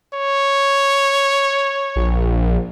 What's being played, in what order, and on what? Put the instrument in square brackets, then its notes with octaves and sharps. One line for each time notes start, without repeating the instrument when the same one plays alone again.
[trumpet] C#5
[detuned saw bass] A#1